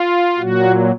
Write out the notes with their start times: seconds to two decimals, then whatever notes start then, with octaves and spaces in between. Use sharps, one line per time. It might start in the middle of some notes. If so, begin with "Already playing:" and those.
Already playing: F4
0.38 A#2 F#3 F#4